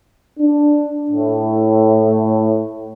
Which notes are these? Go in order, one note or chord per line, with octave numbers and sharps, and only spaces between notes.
D4
A2